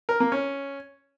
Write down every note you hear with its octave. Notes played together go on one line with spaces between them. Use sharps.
A#4
A#3
C#4